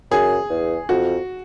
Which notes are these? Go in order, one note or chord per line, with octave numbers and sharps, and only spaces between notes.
F#2 G#4
E2
F2 F#4